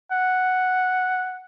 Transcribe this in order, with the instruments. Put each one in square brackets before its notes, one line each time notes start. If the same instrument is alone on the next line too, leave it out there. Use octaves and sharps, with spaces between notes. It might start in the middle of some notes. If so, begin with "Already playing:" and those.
[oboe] F#5